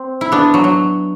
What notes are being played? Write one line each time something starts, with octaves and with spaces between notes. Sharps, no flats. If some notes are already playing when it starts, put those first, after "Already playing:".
Already playing: C4
E4
B3 D4
F#3
F#3